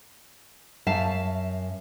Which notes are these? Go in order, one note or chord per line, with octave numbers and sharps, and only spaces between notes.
F#2 E5 F5 A5